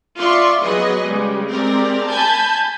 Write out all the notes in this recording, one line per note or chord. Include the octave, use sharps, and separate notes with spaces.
F4 D5 E5 C6 C#6
F#3 B3 G#4 B4 D#5
C#3 G3 G#3
G#3 C4 G4 A#4 D5
G#5 A5 B5 G6 G#6